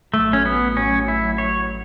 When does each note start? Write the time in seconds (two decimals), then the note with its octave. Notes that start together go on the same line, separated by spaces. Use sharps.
0.14 A1 A2 F#3 A3
0.33 C#4
0.46 B3
0.77 C#4
1.08 E4
1.38 C#5